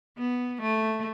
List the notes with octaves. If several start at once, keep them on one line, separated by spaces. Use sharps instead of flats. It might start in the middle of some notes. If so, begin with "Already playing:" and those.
B3
A3